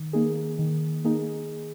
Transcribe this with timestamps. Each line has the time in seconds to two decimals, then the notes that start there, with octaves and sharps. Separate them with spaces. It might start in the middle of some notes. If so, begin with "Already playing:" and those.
Already playing: D#3
0.13 A#3 D#4 G#4
0.59 D#3
1.05 A#3 D#4 G#4